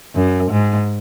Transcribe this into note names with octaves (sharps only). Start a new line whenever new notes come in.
F#2
G#2